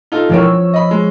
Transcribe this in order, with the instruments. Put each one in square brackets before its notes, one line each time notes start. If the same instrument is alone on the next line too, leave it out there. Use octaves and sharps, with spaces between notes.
[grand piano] D#4 F4 A4
[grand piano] E1 E3 A#4 [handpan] F3 C#5
[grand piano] E6
D#5 B5
G#3